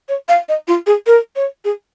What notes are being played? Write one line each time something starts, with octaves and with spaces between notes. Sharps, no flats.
C#5
F5
D#5
F4
G#4
A#4
C#5
G#4